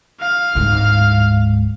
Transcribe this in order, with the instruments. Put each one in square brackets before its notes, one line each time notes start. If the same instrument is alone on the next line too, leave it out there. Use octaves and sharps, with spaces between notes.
[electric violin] F5
[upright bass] D1 G#2